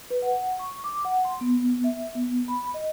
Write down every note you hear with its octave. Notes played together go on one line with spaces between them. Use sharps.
B4
F#5
C#6
D6
F#5
C6
B3
B3
E5
B3
B5
D#5